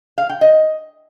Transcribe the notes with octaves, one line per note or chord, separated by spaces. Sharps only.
F5
G5
D#5